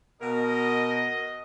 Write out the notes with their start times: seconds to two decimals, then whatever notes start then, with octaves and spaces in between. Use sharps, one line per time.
0.21 B2 A#4 D#5